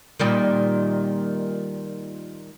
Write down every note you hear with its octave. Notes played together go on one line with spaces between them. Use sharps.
A#2 D#3 G3